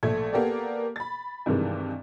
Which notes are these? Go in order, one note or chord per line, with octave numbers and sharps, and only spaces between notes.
A#1 A3 A4 G#6
A#3 B3 G4 A4 A#4 D5
B5 A6
G2 C3 D#3 E3 G#3